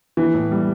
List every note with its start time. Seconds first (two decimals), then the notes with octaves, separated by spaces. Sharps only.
0.17 E3
0.34 A2
0.51 G3